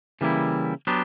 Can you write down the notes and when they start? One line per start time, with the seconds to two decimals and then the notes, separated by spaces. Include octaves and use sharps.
0.21 C#3 E3 G3 A#3 E4
0.87 F#3 B3 D4 G4